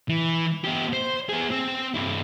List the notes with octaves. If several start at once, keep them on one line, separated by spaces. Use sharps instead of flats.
E3
B3 G4
C5
B3 G#4
C4
G2 E4